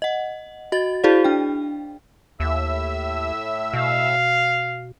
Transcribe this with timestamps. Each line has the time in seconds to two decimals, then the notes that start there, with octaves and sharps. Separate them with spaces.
0.02 D#5 F#5
0.72 F#4 D#5 A6
1.04 E4 F#4 G#4 C5 D5 F5
1.24 D4 G5
2.40 D#2 A2 E5 E6
3.74 B2 F5